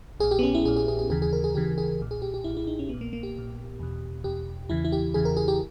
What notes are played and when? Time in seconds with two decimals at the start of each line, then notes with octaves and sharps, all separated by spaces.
0.20 A#1 A#2 G#4
0.31 G4
0.39 B3
0.43 C#4
0.55 E4
0.65 A#1 A#2 G#4
0.76 G#4
0.88 G#4
0.99 G#4
1.10 D#2 C#3 E3 G#4
1.22 G#4
1.33 A#4
1.44 G#4
1.55 D#2 C#3 E3 G4
1.78 G#4
2.00 B1 A#2
2.11 G#4
2.22 G4
2.34 G4
2.44 B1 A#2 E4
2.57 E4
2.67 D#4
2.79 C#4
2.89 A#1 A#2 B3
3.01 A#3
3.13 A#3
3.23 G4
3.34 A#1 A#2
3.79 E2 B2
4.24 E2 B2 G4
4.69 E2 C#3 E3 E4
4.84 E4
4.92 G4
5.14 E2 C#3 E3 G#4
5.25 A#4
5.37 G#4
5.48 G4